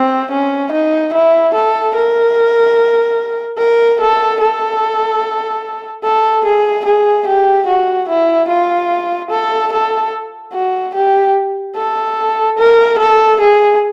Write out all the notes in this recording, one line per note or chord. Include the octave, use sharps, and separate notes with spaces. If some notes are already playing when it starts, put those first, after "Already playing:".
Already playing: C4
C#4
D#4
E4
A4
A#4
A#4
A4
A4
A4
G#4
G#4
G4
F#4
E4
F4
A4
A4
F#4
G4
A4
A#4
A4
G#4